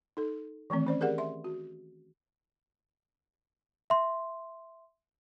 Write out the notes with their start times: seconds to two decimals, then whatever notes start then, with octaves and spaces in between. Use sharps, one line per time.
0.17 D#4 A4
0.70 D#3 E3 A3 C4
0.87 C#4 C5 D5
1.01 G4 G#4 A#4 D5 F#5
1.18 E5 C6
1.44 F#4
3.90 E5 C6